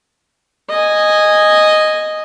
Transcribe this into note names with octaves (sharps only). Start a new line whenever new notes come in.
D#5 G#5